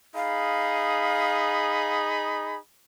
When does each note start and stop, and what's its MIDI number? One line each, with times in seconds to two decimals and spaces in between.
0.15 2.58 63
0.15 2.58 68
0.15 1.99 77
0.15 2.58 83